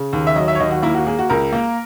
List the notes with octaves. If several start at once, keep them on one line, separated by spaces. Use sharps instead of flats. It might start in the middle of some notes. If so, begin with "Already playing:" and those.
Already playing: C#3
D#2
E5
F#3 D#5
E5
C#5
D#2 D#5
F#4
A#3 E4
F#4
A#3 G#4
F#4
C#2 A#4
A#3